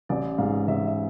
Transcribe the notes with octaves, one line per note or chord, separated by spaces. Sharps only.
A1 D5
G#2 E3 G#3 F5
A1 E5
E5